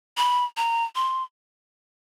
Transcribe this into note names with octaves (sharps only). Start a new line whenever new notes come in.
B5
A#5
C6